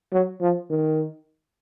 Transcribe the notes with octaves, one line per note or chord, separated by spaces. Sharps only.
F#3
F3
D#3